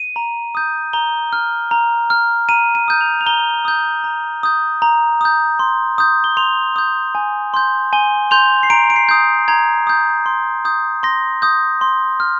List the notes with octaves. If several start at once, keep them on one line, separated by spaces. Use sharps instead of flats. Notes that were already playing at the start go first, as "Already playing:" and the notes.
Already playing: D#7
A#5
D#6 G6
A#5 G7
F6
A#5
F6
A#5 D#7
D#7
D#6 G6
F7
F7
A#5 G7
D#6 G6
A#5
D#6 G6
A#5
D#6 G6
C6
D#6 G6
G7
C6 F7
D#6 G6
G#5
C6 G6
G#5 G7
C6 G6 F7
C7
A#5 D7
D7
C7
D#6 G6
A#5 G#6
D#6 G6
C6
D#6 G6
C6 A#6
D#6 G6
C6
F6